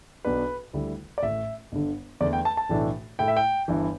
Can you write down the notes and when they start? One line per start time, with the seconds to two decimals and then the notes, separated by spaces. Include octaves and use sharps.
0.25 B1 B2 B3 D4 B4
0.73 D2 D3 G3 E4
1.18 D5
1.23 A1 A2 A3 E5
1.72 G1 G2 D3
2.20 E2 D3 A3 D4 D5
2.33 G5
2.45 A5
2.57 A5
2.69 B1 A2 E3 A3 D4
3.19 A2 A3 E4 G5
3.28 E5
3.37 G5
3.68 G1 G2 E3